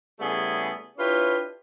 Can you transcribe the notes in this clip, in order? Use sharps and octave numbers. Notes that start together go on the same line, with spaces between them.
C#3 G3 A3 B3 E4 G#4
D4 E4 F4 G4 B4 C#5